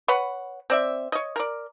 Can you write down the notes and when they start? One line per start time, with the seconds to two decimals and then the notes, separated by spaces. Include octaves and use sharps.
0.08 B4 C#5 F#5
0.70 C4 D5 E5
1.12 C#5 D#5
1.36 A#4 D5